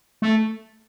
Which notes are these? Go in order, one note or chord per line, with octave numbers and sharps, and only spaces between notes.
A3